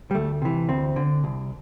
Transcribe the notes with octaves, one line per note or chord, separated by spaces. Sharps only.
G3
D2 A3
C3 E3
D2 C4
D3
C2